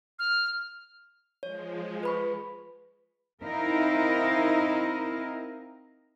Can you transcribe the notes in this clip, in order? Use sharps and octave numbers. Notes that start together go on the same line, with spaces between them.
F6
F3 G#3 C#5
B4 B5 C#6
C4 D#4 E4 A#4 D#5 F5